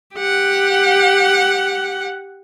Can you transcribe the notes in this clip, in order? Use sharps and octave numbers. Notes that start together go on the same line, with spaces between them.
G4 F#5